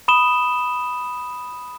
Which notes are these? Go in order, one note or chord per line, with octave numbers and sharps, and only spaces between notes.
B5 D#6 E7 G7